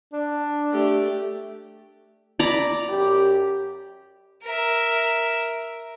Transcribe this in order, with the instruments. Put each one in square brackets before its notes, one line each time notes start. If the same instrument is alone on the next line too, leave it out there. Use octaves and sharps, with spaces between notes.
[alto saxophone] D4
[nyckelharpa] A3 G4
[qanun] D5 A#5 B5
[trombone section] F#2 G4
[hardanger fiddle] A#4 E5